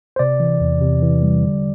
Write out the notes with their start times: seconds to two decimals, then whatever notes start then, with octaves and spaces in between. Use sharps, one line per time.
0.16 C5
0.19 C3 D5
0.40 E3
0.61 E2
0.81 C3
1.02 E3
1.23 G3
1.44 D3